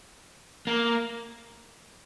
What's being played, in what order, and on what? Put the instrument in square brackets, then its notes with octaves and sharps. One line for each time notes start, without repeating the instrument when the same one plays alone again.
[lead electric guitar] A#3